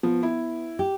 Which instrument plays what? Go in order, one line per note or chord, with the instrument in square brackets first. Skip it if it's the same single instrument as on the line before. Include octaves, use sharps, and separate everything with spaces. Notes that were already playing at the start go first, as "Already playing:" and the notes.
[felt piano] F3 [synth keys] B3
[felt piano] E4
[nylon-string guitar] G4